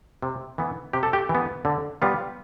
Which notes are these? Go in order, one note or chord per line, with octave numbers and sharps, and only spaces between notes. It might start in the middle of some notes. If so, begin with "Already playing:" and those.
C3
E3 B3 E4
C3 G4
A4
G4
E3
B3
D3
G3 B3 F4